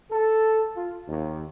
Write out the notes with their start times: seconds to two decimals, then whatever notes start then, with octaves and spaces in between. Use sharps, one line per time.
0.11 A4
0.77 F4
1.08 D#2